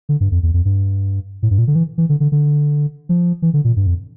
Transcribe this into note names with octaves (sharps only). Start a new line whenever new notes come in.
D3
G2
F2
E2
F2
G2
A2
G2
A#2
D3
E3
E3
D3
D3
D3
F3
E3
D3
A#2
G2
F2